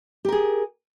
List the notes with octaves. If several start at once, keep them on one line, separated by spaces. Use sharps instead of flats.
G4 G#4 A#4